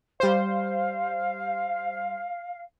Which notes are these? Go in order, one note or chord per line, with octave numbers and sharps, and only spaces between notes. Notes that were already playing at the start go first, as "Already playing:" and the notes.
G3 C5 F5